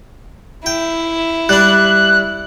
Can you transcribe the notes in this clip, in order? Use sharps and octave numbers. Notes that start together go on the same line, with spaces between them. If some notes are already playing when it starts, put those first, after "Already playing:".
E4 G5
G3 D4 F#6